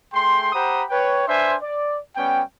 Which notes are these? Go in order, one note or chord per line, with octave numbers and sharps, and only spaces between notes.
A3 G#4 G5 C6
G4 C5 F#5 A#5 B5 D#6
B4 C#5 G5
D4 B4 C5 E5 G#5 C6
D5
G3 B3 C#4 G5